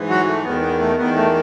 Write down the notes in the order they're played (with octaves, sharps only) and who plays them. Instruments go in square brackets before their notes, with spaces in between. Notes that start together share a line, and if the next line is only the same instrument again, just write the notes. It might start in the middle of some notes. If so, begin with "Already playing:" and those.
Already playing: [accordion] G#2 E3
F#3 F#4
A3
E2 D#3 B3
B3
A3
E2 D#3 B3
A3